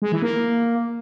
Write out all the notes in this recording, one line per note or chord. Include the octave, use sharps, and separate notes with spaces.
G#3
E3
A#3